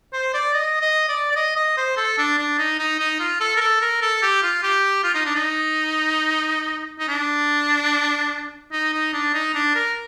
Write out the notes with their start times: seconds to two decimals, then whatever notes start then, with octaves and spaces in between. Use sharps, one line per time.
0.13 C5
0.34 D5
0.54 D#5
0.81 D#5
1.09 D5
1.32 D5
1.36 D#5
1.56 D#5
1.77 C5
1.97 A4
2.18 D4
2.38 D4
2.59 D#4
2.79 D#4
2.99 D#4
3.20 F4
3.40 A4
3.57 A#4
3.61 A4
3.81 A#4
4.02 A4
4.22 G4
4.42 F4
4.63 G4
5.04 F4
5.14 D#4
5.25 D4
5.35 D#4
6.99 D#4
7.09 D4
8.72 D#4
8.93 D#4
9.13 D4
9.34 D#4
9.54 D4
9.75 A#4